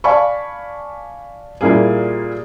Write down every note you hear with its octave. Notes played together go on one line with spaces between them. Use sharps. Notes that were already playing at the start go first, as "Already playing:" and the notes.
D5 F5 G#5 A5 B5 C#6
A#2 G3 A#3 E4 G#4